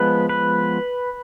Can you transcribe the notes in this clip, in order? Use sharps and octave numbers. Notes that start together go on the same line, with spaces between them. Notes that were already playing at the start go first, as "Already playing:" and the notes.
Already playing: F3 G#3 B3 B4
B4